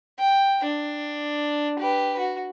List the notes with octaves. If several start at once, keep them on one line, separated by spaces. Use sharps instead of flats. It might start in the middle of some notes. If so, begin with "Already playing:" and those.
G5
D4
G4 B4
F#4